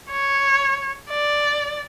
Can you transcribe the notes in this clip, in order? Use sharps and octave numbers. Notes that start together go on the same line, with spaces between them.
C#5
D5